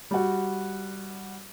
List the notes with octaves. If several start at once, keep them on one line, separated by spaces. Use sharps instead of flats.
G3 F#4